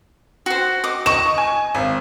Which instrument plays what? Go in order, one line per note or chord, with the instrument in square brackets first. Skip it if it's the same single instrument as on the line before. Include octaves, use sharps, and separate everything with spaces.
[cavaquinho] F#4 C5
D#5 D6
[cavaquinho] D#5 [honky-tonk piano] C#6 E7
[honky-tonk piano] G#5
G#1